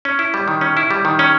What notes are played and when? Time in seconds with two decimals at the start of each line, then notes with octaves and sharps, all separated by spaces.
0.05 C#4
0.19 E4
0.34 G3
0.48 D#3
0.61 C#4
0.77 E4
0.91 G3
1.05 D#3
1.19 C#4